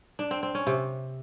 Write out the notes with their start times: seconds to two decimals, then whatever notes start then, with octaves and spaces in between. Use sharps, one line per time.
0.19 D4
0.31 C4
0.43 C4
0.55 C#4
0.67 C3